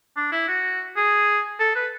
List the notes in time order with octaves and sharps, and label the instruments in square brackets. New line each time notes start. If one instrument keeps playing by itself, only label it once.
[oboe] D4
E4
F#4
G#4
A4
B4